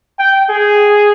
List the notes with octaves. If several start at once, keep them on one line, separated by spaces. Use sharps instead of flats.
G5
G#4